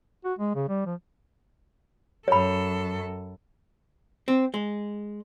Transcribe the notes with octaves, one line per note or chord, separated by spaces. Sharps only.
F#4
G#3
C#3
G3
F3
F#2 A4 C#5 B5
C4
G#3